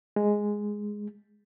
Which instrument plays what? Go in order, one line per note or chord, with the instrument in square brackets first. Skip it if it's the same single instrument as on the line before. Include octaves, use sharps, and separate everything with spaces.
[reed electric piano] G#3